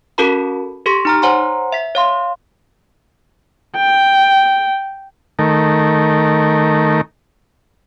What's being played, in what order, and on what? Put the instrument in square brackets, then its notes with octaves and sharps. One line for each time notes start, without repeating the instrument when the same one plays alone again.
[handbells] C#4 F#4 A4 A#4 A5 B5
G4 A4 C6 C#6 A#6
D#4 A#5 F6
C5 C#5 F#5 G#5 A#5 C6
E5 B6
C#5 F5 C6
[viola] G5
[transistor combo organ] D#3 A3 A#4